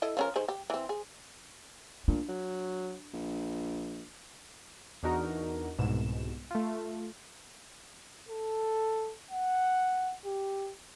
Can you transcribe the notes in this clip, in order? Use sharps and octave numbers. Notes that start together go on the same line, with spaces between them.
E4 A4 D#5
F3 C#4 A#4
D#3 G#4 C5
G4
E3 C4
G#4
A#2 D4
F#3
A#1
E2 D4 D#4 F#4 A#4
C2 G#2 B2 E7
A3 F4
A4
F#5
G4